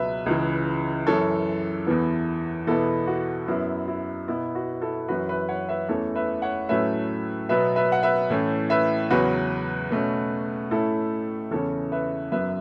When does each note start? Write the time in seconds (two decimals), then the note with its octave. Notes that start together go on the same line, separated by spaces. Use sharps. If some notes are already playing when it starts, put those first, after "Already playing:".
Already playing: C#2 B2 F#3 B4 E5
0.26 C#2 C#3 E3
1.07 F#2 E3 C#4 A4 C#5
1.86 E2 E3 B3
2.67 E2 B2 B3 E4 A4
3.07 F#4
3.47 F#2 F#3 B3 E4
3.88 E4
4.28 B2 B3 E4
4.55 F#4
4.81 E4 A4
5.08 F#2 E3 C#4 F#4 B4
5.29 B4 E5
5.48 C#5 F#5
5.69 B4 E5
5.89 E2 E3 A3 C#4 A4 C#5
6.15 B4 E5
6.42 C#5 F#5
6.69 A2 F#3 A3 C#4 B4 E5
7.49 B2 F#3 B3 B4 E5
7.76 B4 E5
7.92 F#5
8.03 B4 E5
8.30 A2 E3 A3 C#4
8.70 B4 E5
9.10 E2 C#3 F#3 C#4 F#4 B4
9.90 B2 A3 C#4
10.71 A2 A3 C#4 E4 A4
11.51 E2 C#3 E3 C#4 A4 C#5
11.92 B4 E5
12.32 F#2 F#3 B3 B4 E5